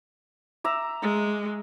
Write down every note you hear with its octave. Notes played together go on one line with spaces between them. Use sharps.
E5 A#5 D6
G#3